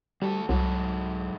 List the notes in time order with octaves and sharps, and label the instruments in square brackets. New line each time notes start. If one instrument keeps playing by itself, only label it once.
[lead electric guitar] D2 A4 [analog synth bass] G3
[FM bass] C2 [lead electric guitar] G#2 A4 [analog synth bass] F#3